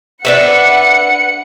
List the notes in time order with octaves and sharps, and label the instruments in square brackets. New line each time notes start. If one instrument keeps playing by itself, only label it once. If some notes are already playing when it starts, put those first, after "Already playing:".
[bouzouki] D4 B4 E5 [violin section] F#5 C#7